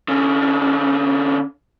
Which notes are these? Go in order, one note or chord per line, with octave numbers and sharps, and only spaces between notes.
D3 C#4